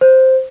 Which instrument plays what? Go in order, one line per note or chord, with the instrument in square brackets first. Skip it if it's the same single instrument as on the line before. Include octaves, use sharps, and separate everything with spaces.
[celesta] C5